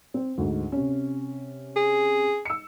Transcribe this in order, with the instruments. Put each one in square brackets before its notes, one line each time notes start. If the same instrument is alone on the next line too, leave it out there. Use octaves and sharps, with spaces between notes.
[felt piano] C4
D2 G#2
C3 C#4
[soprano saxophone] G#4
[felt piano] E6 C#7